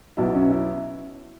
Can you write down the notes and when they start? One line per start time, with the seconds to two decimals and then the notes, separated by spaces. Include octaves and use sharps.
0.17 B1 B2 F#3 E4
0.35 C#4
0.51 E4